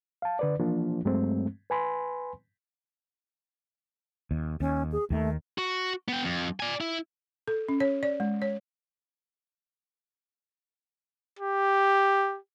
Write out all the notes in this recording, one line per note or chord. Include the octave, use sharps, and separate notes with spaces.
F5 A5
D3 B4 D5
E3 F3 A#3 D4 F4
G2 F#3 G#3 A3 C4
B4 G#5 B5 C6
D#2
D#2 C#4
G#4
D#2 D#3 A3
F#4
B3 G5
F2
D5 G#5
E4
A4
C#4
C#5
D5
G#3
C#5
G4